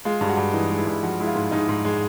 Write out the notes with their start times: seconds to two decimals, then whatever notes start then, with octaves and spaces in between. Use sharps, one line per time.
0.05 G#3 F4
0.21 G2
0.29 F#4
0.37 G2
0.54 E3 D#4
0.71 G#3
0.79 E4
0.87 G2
1.03 F3 F#4
1.20 G#3 E4
1.27 F4
1.35 G#2
1.51 G#2 D#4
1.69 G#2
1.85 G#3